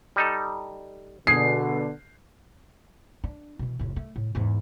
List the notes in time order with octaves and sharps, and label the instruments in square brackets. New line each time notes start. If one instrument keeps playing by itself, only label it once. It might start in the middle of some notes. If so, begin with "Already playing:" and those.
[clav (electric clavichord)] G3 D#4 A4
[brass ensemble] B2 D3 [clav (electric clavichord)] G#4 [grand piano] C7
[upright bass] D4
B2 E3
F1 A2
A3
A2
E2 G#2